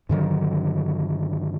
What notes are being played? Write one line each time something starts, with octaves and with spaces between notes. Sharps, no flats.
G2 D3 D#3 F#3